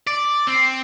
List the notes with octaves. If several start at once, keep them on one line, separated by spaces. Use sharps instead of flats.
D5
C4